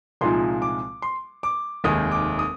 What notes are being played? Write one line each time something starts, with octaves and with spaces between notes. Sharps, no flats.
C2 A#2 F3 G#3 D#4 C6
D6
C6
D6
F1 D#2 D#3 G#3 D#4 D#6
D6
D#6